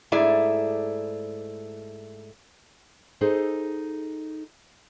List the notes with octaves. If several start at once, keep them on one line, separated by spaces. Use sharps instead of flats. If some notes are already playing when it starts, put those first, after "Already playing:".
G#2 A3 E4 G#4 D5
D#4 G#4 A4 C5